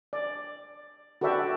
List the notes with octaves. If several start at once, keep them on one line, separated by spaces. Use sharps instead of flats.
D5
F#4 A4 B4 D5 E5 G5